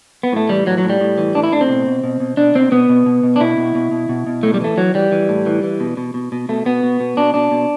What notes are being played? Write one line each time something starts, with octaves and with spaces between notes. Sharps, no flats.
B3
A2 A3
E3 G3
A2 F#3
F#3
A2
G3
A2
E3
A2 D4
E4
A2 D4
C4
B2
B2
B2
B2
B2 D4
B2 C4
B2 B3
B2
B2
B2
D4
B2 E4
B2
B2
B2
B2
B2
A2 A3
G3
E3 A3
E3 F#3
E3 G3
E3
A2
E3
E3
B2
B2
B2
B2
B2 A3
B2 B3
B2
B2
B2 D4
B2 D4
B2